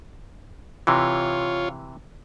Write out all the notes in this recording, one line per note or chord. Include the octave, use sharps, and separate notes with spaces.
C3 E3 F4 C#5